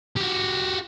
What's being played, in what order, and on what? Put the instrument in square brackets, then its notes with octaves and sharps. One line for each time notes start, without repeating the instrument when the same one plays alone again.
[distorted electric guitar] F#4 G4